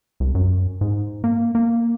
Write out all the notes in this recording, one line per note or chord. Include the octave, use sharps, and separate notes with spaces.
C2
F#2
G#2
A#3
A#3